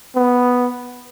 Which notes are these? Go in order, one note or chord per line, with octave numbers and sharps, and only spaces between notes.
B3